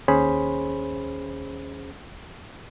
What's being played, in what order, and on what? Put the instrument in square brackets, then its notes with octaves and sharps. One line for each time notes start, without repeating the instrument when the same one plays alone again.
[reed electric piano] D#2 C#4 G#4 C5 C#5 B5